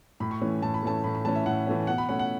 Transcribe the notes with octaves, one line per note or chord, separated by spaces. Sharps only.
A2 B5
C#6
E3 A3 C#4
A2 A5
B5
E3 A3 C#4 A5
A2 B5
B5
E3 A3 C#4 A5
E5
A2 F#5
E3 A3 C#4
B2 F#5
B5
A3 C#4 F#5
F#5